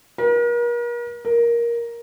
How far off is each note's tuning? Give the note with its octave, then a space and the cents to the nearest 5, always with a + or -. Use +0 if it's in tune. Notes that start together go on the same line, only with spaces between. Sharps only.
A#4 +40
A#4 +10